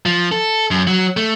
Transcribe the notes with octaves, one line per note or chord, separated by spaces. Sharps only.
F3
A4
F#2
F#3
A3